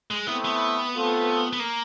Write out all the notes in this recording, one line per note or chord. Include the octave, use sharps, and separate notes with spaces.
G#3
A3 B3 C4 E4
B3
A3 C4 F4 A4
B3
A#3